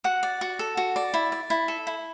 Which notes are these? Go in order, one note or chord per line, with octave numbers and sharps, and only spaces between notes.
F#4 F#5
D5
F#4
A4
F#4
D5
E4
D5
E4
A4
E4